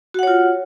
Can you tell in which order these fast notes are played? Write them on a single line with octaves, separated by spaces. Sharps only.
F#4 F#5 C#5 F4